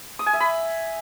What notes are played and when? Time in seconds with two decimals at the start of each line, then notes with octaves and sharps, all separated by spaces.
0.19 D#6
0.26 G#5
0.33 E5
0.40 B5